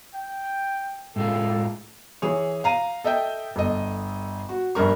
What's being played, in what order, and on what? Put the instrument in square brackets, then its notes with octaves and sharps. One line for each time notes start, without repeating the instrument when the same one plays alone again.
[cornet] G5
[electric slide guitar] A2 G#3 F4 [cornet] A4
[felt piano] E3 G#4 C#5
F5 A#5 D#7
A4 D#5 E5 G5
G1 A4 D#5
F#4
A#1 G2 A#4 C#6